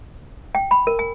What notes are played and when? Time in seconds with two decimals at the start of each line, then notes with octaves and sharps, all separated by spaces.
0.55 G5
0.71 B5
0.87 A#4
0.99 G#5